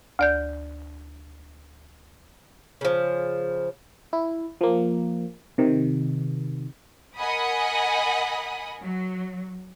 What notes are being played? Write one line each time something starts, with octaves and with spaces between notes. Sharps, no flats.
D2 D5 G6
C#3 F3
E4
F3 A#3
C3 D#3
A#4 D#5 F#5 G#5 B5 D#6
F#3